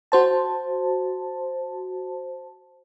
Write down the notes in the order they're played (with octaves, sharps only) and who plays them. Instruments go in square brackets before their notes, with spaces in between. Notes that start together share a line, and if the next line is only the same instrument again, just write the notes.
[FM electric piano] F#4 C5 A5